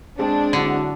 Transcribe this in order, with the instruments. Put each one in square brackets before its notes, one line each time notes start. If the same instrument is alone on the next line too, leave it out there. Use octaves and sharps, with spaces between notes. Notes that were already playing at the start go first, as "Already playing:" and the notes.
[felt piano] G#3 C4 [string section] D4
[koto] D3 [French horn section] F#3 E4 F#4